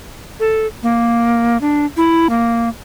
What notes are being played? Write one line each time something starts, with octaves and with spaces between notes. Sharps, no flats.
A4
A#3
D4
E4
A#3